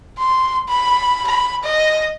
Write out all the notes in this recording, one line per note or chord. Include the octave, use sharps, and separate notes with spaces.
C6
B5
B5
D#5